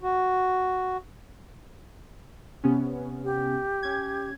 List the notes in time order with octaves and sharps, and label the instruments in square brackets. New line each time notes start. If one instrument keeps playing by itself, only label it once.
[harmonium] F#4
[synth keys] C3 B3 C#4
[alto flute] G4
[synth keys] C#4 G#6